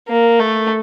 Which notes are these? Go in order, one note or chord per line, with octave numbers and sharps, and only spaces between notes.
A#3
A3